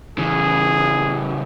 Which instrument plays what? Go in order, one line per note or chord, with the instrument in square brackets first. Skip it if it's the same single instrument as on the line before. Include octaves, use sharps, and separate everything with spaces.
[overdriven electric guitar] C#3 E3 [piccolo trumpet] G#4